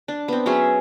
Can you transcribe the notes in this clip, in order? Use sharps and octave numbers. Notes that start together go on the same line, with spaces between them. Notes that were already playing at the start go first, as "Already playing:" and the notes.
D4
B3 C4
F#3 C#4 G#4 E5